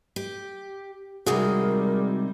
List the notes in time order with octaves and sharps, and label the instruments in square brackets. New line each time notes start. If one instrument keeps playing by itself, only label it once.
[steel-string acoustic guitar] G4
[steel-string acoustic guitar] C3 D#3 G#3 [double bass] G3 [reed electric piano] F#4 G#4 D#6 [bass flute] A#4